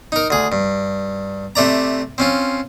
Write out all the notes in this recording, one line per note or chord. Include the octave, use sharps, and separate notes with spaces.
D#4 A#4
D2 G#4
G2
C3 A3 D5 A#5
C4 C#4 F4